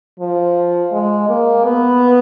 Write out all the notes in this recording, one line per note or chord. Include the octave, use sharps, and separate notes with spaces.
F3
G#3
A#3
B3